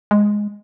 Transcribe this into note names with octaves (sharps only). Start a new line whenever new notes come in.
G#3